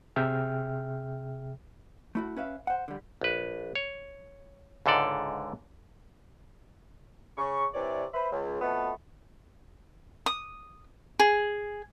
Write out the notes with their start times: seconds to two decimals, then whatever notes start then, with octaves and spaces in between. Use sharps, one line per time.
0.16 C3 G#4 E5 G5 F6
2.15 A3 E4 F#4
2.36 C#4 B4 E5 F5
2.67 C5 F#5
2.88 D3 G3
3.21 A#1 B4
3.75 C#5
4.86 C#2 G#2 D3 A4 D5
7.37 C#3 C#6
7.74 G2 C3 E3 C#5 D5
8.13 B4 C5 E5 B5
8.32 C#2
8.61 F2 B2 A3 B3
10.26 D#6
11.19 G#4